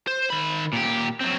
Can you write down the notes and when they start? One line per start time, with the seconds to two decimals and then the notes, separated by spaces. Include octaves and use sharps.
0.07 C5
0.30 D#3 B5
0.73 A#2 G4
1.20 F#3 C4